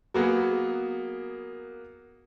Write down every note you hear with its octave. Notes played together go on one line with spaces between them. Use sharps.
F#3 A#3 B3 G#4